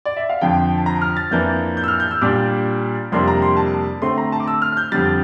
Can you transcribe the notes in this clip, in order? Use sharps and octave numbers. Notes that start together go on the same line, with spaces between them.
D5
E5
F5
F2 D3 F3 G5
A5
A#5
F6
A6
F2 E3 A#3 D4 G6
G6
E6
F6
G6
E6
A#2 G3 D4 D6
F2 C3 G3 A#3 D4 C6
A#5
C6
A5
D3 A3 C4 C6
A#5
A5
D6
E6
F6
F6
G6
F2 D3 G3 A6